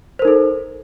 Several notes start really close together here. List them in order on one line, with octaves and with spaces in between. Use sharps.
C5 A#4 D#4 A4